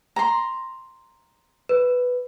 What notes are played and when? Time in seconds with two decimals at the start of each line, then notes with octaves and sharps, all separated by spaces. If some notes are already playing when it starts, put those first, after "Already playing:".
0.16 A#5 C6
1.69 B4